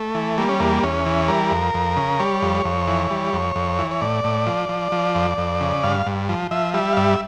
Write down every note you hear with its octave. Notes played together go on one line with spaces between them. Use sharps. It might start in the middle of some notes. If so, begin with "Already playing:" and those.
Already playing: A3
E3
G3 A#3
C#4
E2 A#3
E2 C#4
E3
G3 A#4
F2
F2
C#3
G3 C#5
F2
F2
E3
G3
F2
F2
E3
C#5
A2 D5
A2
F3
F3
F3
F2
F2
C#3
G2 F5
G2
F3
F3 E5
G3 E5
F5
G2 E5